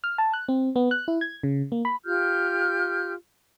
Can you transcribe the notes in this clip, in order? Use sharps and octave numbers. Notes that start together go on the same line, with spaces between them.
F6
A5
F#6
C4
B3
F#6
E4
G#6
C#3
A#3
B5
F4 G4 F6 G6